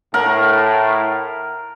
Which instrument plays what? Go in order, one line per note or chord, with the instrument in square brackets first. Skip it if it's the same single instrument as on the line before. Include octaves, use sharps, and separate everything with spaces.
[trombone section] A2 [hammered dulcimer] A#4 F#5